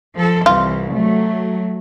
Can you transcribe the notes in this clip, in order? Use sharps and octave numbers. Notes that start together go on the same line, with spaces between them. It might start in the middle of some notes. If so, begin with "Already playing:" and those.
F3 A4
C2 E3 F4
F#3 A3